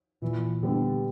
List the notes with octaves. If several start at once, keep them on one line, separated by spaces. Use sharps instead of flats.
A#2 E3
D3 G3 B3 D4